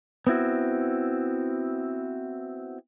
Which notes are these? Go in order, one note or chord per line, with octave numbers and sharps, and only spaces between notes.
B3 C4 E4 F#4